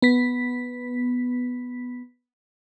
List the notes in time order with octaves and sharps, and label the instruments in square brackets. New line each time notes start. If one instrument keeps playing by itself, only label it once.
[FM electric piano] B3 B6